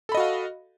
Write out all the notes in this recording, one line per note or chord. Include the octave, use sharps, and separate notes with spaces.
F#4 A4 D#5 F5 B5